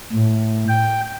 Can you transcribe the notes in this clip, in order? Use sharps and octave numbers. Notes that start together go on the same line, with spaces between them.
A2
G5